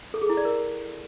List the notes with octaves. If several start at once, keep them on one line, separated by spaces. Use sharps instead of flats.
A4
G#4
E4
D5
A#4